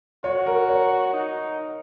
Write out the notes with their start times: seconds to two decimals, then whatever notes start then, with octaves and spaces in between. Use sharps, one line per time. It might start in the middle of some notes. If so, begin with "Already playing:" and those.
0.24 F#4 C#5
0.46 A#4
0.69 C#5
1.14 D#4